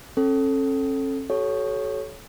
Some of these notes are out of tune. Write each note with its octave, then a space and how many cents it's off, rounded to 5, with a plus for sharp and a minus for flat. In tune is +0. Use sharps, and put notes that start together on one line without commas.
C#4 -45 A4 +0
F#4 +40 A4 -30 C#5 +0